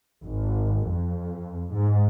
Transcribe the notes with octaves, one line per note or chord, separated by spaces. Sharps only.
G#1
F2
G#2